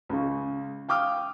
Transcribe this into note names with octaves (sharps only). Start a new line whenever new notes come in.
C#2 C#3
F5 G5 D6 D#6 F6